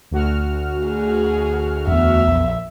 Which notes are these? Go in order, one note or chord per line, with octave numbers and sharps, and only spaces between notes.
D2 F#4 F6
G#4
E2 B3 E5
A#1